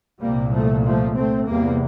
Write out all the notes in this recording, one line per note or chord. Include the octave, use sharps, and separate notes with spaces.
C2 A#2 G3 A#3
F3 A3
F3 A3
A3 C4
E2 C3 G3 A#3